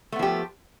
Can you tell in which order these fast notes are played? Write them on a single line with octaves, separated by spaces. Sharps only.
A3 B3 F3 G4